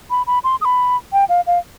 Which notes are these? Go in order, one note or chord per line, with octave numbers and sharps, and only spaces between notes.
B5
B5
C6
D#6
B5
G5
F5
F5